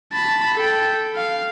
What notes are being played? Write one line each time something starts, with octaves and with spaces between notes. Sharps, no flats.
A5 B5
A4 G5
F5